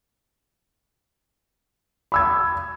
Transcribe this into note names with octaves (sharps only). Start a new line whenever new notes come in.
B5 E6 G#6